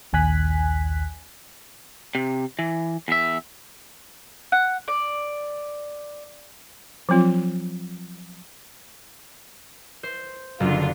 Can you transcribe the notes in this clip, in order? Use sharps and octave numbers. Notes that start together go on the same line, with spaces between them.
A#1 D#2 G#5 F#6 B6
C3
E3
E2 E5
F#5
D5
F3 F#3 C4 F4
C5
F#1 D3 F4